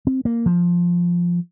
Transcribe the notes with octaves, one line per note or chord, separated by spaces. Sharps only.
C4
A#3
F3